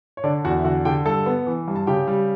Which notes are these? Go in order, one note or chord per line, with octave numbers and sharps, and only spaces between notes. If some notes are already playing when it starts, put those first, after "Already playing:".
C#5
D3 D4 D5
E2 F#4 F#5
E5
D3 F#4 F#5
D3 G4 G5
G2 A4 A5
B3
E3
G2
A5
C#3 G4 G5
G3